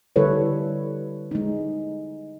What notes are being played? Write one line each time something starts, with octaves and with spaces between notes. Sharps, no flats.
D3 G3 E4 A4 B4 C#5
G#3 D#4